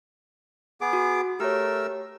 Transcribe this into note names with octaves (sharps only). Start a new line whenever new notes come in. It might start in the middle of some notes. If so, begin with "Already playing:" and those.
B3 G#4 D6
F#4
A3 G4 A#4 C#5 E6